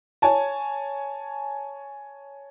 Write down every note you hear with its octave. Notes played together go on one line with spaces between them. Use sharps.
C#5 G#5 A5